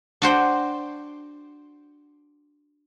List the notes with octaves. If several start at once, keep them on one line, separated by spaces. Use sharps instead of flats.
D4 F#4 C5 G5